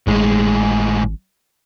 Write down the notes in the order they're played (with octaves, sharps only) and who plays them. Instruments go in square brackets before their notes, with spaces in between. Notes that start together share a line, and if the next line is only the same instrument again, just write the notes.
[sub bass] G#1 [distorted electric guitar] A2 G#3